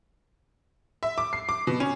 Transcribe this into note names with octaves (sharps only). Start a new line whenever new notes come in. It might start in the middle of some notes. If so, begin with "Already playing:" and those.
E5
D6
C7
D6
B2
C#4